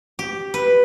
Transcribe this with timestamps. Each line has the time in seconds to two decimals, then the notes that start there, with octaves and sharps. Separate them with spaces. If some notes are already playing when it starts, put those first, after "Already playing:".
0.19 G4
0.54 B4